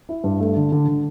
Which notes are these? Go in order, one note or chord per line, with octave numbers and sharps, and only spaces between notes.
E4
G2
A3
D3
D3
D3